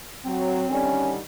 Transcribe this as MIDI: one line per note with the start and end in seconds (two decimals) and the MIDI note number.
0.25 0.64 54
0.25 1.07 60
0.70 1.17 50
0.70 1.17 51
0.70 1.17 55
0.70 1.13 61